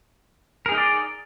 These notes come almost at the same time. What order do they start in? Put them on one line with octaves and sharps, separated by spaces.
A#4 G#4 D#4 D#5 D5